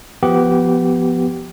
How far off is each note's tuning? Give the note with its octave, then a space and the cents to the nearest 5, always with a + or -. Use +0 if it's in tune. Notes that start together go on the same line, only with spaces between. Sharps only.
F3 +0 B3 +0 G4 -15